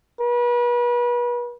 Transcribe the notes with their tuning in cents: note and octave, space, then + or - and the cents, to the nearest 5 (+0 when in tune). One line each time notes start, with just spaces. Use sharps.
B4 -35